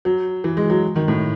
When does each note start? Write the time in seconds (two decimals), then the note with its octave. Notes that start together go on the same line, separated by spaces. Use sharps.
0.05 F#3
0.44 E3
0.57 G#3
0.70 F#3
0.96 D#3
1.08 A2